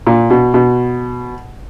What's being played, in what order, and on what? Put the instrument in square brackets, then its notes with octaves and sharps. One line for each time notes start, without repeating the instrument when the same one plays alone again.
[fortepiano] A#2
B2
B2